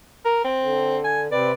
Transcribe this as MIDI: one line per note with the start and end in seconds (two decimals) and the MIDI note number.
0.25 0.42 70
0.44 0.97 60
0.61 1.28 50
1.04 1.21 80
1.31 1.52 48
1.31 1.52 60
1.31 1.52 71
1.31 1.52 74